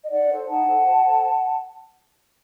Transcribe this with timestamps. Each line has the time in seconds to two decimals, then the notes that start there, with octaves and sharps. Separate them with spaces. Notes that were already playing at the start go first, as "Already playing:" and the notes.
0.04 D#5
0.10 D#4 D5 F#5
0.29 A4 C5
0.48 D#4 F#5 A5
0.67 A4 C5
0.86 F#4
1.04 A4 C5